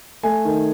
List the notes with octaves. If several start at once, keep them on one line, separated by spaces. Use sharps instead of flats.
A3 G#5
D#3